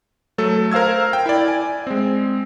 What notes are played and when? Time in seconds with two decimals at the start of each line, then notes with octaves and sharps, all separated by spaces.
0.38 F#3 A3 A4
0.71 A#4 C5 F5 E6 G#6
1.13 G5
1.26 E4 D5
1.48 G#5
1.87 G#3 C4